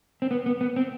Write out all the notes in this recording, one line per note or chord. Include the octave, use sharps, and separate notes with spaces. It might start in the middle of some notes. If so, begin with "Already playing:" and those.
C4
B3
B3
B3
C4